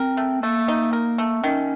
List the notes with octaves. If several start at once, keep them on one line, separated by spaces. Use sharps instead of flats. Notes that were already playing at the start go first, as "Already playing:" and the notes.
Already playing: C4 A#4
A3
A3 A#3
D#4
A#4
A3
D#3 C#4